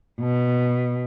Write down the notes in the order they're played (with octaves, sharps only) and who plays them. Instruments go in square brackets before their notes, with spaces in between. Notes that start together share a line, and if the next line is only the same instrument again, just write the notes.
[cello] B2